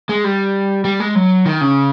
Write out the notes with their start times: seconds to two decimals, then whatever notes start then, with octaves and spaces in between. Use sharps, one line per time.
0.09 G#3
0.24 G3
0.85 G3
1.00 G#3
1.15 F#3
1.46 D#3
1.61 C#3